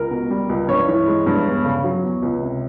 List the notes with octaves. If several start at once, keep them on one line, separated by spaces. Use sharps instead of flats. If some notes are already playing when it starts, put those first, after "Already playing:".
Already playing: C#2 A#4
B2
G3
C#2
G2 C#5
E3
G#3
G2
E2
C#3
F#3
E2
C#2
C3